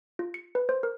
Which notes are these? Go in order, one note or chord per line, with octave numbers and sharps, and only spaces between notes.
F4
C#7
B4
C5
A#4